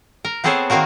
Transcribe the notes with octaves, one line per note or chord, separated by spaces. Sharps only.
A#4
B3 C4 G#4 A4 C5 C#5
D#3 A#3 C4 F#4 A#4